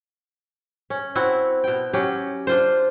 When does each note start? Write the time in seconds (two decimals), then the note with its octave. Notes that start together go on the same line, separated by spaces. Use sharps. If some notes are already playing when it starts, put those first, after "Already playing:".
0.90 C#4
1.15 C4 E4 F#4
1.64 B2 G5
1.93 F#3 C#4 G4
2.47 D4 F4 C5